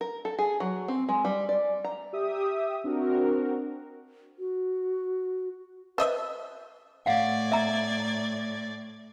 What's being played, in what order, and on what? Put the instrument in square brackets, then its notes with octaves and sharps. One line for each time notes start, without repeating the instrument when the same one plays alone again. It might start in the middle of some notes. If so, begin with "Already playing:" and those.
[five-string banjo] A#4
A4
G#4
F#3
C4
G#3
G3
D5
A#5
[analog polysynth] G4 E5 D#6
C4 D4 F#4 A#4
[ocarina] F#4
[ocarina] B4 [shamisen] C5 D#5 E5
[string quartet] A2 D5 G#6 [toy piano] F5 F#5
[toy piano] E5 A#5